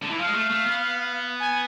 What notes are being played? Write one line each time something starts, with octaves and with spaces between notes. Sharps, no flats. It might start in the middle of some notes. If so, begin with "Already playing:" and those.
D3
E3
F3 F5
G#3
A3
A3
B3
G#5